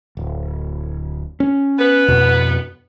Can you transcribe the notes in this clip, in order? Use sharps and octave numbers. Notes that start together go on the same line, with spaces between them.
D1
C#4
B3 B4
F2 B2